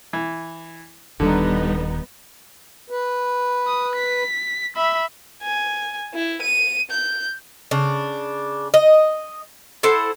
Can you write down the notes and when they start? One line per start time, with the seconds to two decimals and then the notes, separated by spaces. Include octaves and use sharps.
0.13 E3
1.20 D#1 D3 D#3 G3 B3 D#4
2.90 B4
3.67 D#6
3.96 B6
4.76 E5 B5
5.42 G#5
6.14 E4
6.42 D#7
6.91 G6
7.71 C#3 D4
8.74 D#5
9.83 E4 A4 C5 F#5